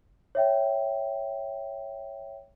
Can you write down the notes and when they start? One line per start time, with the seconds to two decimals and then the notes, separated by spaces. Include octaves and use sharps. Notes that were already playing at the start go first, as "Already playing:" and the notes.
0.35 C#5 E5 G5